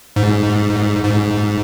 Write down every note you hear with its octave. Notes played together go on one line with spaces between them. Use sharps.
G#2
G#2